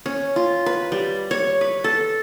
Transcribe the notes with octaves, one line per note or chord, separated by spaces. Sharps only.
C#4
F4
B4
G3
C#5
B4
A4